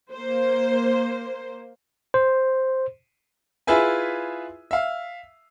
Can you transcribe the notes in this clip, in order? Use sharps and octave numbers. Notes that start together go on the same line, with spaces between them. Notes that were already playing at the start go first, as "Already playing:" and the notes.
A#3 C5
C5
E4 F4 G#4 B4 E5 G#5
E5 F5